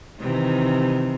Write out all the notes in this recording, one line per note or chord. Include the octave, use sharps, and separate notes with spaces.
C3 D#3 E3